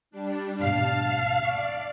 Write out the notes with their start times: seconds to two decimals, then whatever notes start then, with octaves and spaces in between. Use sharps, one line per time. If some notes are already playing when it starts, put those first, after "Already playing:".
0.11 G3 D4
0.62 D2 G#2 B2 F5 A5 F6
1.45 D5 C#6